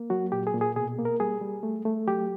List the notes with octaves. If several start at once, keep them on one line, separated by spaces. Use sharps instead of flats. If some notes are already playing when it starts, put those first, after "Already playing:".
Already playing: A#3
F#3 F#4
A#2 G4
G#4
A#2
G#4
B2 G#4
A#3
A#4
G3 G#4
G3
A3
A3
F#3 G4